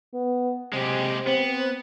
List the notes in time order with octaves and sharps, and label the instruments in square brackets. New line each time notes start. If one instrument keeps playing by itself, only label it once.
[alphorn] B3
[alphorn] C3 [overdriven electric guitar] G#3 G4
[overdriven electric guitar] B3 [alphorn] C4